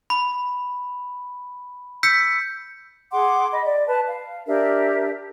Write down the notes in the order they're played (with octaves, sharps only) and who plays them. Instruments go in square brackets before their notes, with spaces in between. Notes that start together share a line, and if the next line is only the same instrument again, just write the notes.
[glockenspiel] B5
E6 G6 B6 C#7
[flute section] G#4 F#5 C6 D6
D#5 B5
D5
B4 A5
F5
D4 G4 A#4 E5